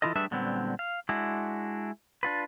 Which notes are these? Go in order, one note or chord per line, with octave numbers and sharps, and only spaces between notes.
E3 G3 E4 F4 A4 D#5
G3 A3 D4 G#4 B4 E5
A#2 D3 F#3 G3 B3 C4
F5
G#3 D4 E4 F#4
D4 F4 B4